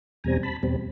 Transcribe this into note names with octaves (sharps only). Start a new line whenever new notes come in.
E2 B2 G3 C4 G#5 A#5
A5 B5
E2 B2 G3 C4